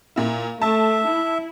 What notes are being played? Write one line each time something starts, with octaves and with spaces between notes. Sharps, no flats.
A#2 E4
A3 E5 A5
E4